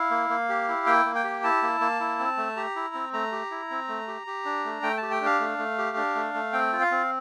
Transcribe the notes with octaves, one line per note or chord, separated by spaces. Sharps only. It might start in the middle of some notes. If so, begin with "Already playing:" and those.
Already playing: E4 F5
A#3
A#3
G4
E4
A#3 G5
A#3
G5
G4
E4 A5
A#3
A#3
E4
C4
A3
G4 A#5
E4
C4
A3 A#5
G4
E4
C4
A3
G4
G4
D4
A3
A3 G5
A5
G4
G5
D4 F5
A3
A3
G4
D4
A3
A3
C4 G5
F4
F5
C4